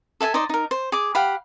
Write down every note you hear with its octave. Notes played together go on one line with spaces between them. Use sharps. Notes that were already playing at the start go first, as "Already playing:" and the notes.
A4 E5 G5 G#5
D#4 C5 D5 D#5
D#4 A#4
C5
G#4 D6
G4 F5 F#5 B5